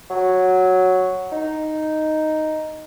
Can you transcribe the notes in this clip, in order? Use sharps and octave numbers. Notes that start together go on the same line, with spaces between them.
F#3
D#4